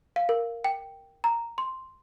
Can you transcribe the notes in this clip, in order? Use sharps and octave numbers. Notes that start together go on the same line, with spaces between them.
F5
A#4
G5
A#5
C6